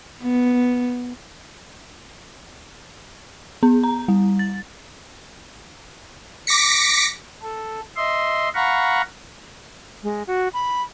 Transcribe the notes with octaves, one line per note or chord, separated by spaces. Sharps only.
B3
B3
A#5
G3
A6
D6 A#6 B6 C#7
A4
D#5 E5 C6
F5 F#5 A#5 B5 C#6
G#3
F#4
B5